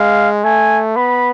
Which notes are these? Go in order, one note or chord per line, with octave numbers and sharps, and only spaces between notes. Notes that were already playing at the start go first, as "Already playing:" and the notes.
Already playing: G#3 F5
A3 G#5
B3 B5